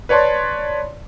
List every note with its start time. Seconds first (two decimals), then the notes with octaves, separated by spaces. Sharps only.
0.09 B4 C#5 D5 A5 C6